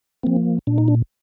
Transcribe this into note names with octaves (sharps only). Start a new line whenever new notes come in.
F3 A#3 C4
A#2 D4
D#4
D4